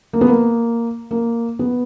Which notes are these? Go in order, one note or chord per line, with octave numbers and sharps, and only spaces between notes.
A#3
B3
A#3
A#3
B3